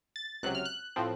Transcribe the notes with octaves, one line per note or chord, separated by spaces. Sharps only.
A6
C#2 C3 F#3 F#6
F6
F#6
A2 F3 C4